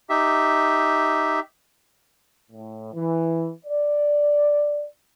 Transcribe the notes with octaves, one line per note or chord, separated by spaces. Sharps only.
D#4 G4 E5
A2
E3
D5